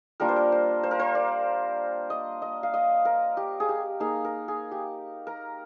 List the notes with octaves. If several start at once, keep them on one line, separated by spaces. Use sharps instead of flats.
G3 A#3 D4 F4 A#4
C5
A#4
C5
C5
A#4
C5
D5
D#5
D#5
F5
D#5
A#4
G4
G#4
G4
A#3 D#4 G#4
A#4
G#4
G4
A#4